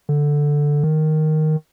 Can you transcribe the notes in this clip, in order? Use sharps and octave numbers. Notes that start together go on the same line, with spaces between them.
D3
D#3